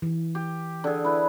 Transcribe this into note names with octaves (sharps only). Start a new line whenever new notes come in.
E3
G4
D3 G#4
E4 B4